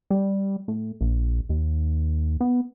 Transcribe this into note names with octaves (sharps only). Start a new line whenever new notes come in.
G3
A2
A#1
D#2
B3